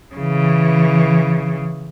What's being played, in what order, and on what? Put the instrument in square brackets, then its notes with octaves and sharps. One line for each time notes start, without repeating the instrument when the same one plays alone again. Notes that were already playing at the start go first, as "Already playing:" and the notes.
[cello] C#3 E3